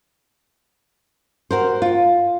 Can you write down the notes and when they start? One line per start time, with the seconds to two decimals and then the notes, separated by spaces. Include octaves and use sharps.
1.51 F#4 A#4 C5
1.82 F4